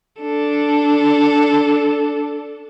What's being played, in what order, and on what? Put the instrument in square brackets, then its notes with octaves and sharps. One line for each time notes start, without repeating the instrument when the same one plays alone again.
[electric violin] D4 A4